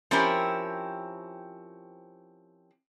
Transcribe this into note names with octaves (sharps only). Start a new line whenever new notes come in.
F3 C4 C#4 E4 G4 A#4